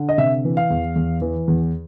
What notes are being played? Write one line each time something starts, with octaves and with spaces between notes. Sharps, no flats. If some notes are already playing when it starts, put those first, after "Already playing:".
Already playing: D3
D#5
C3 E5
E3
F5
E2
E2
E3
E2